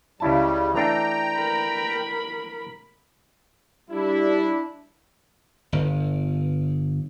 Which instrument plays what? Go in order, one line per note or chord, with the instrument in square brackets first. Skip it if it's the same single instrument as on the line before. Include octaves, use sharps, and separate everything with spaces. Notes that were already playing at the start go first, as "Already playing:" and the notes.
[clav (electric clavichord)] C#2 E4 A5 [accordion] C#3 G3
[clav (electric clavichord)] E3 A3 D4 [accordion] G5 A#5
[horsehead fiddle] A#4 B5
[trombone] G3 [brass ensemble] D4 E4
[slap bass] G1